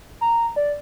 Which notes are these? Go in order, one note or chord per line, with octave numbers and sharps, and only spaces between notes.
A#5
D5